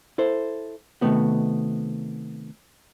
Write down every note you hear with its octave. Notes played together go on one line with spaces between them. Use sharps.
E4 A4 C5
C3 D#3 A3 B3 F#4